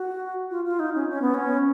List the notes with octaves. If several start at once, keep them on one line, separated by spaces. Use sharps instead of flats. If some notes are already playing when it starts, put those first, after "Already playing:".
Already playing: F#4
F4
F4
D#4
C#4
C#4
B3
C#4